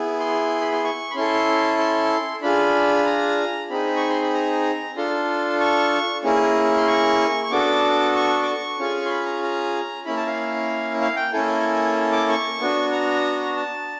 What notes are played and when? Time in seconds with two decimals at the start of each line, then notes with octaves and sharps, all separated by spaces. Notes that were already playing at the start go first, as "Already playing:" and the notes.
Already playing: B3 E4 G#4
0.20 C6
0.61 B5
0.72 C6
0.84 C#6
1.11 B5
1.15 C#4 E4 A4 C6
1.78 C6
2.42 D4 F4 G#4 B5
2.96 B5
3.06 A#5
3.70 C4 D#4 G#4 B5
3.96 C#6
4.10 C6
4.21 B5
4.34 A#5
4.96 D4 F4 A4 C6
5.61 C#6
6.24 A#3 C#4 E4 G#4
6.77 C6
6.88 C#6
7.43 C#6
7.51 B3 D4 F#4 A4 D6
8.15 C#6
8.42 D6
8.47 C#6
8.79 C#4 F4 G#4
9.05 C6
9.10 B5
9.26 A#5
9.43 A#5
10.05 A#3 C#4 E4 B5
10.17 A5
10.27 F5
11.01 F5
11.16 G5
11.33 A#3 C#4 E4 A4 G#5
12.12 D6
12.29 C#6
12.61 B3 D4 F#4
12.92 A#5
13.56 A5